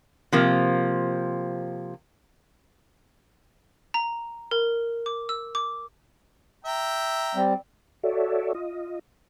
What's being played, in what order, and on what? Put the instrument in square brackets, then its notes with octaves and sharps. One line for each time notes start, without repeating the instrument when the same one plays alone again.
[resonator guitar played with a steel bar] C3 F3 A#3
[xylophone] A#5
A#4
D6
E6
D6
[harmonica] E5 G5 A#5
[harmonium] G3 C4
[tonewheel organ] F#4 A4 C#5 D5 E5
F4 D#5